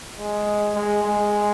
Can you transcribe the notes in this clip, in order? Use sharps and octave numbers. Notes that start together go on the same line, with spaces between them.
G#3
G#3
G#3